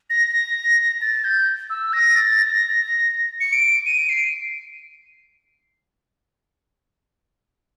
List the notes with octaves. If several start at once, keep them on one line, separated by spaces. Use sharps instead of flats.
A#6
A6
G6
E6
A#6
A6
A6
A#6
C#7
D7
D#7
D7
C7